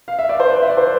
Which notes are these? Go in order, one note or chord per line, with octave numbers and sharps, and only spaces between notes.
F5
E5
D5
C5
B4
E5
D5
C5